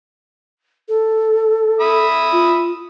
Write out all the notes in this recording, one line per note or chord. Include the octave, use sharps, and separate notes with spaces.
A4
E5 B5 D#6
F4